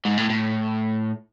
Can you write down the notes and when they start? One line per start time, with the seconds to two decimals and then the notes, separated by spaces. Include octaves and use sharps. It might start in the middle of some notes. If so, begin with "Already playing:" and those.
0.05 G#2
0.18 A2
0.30 A2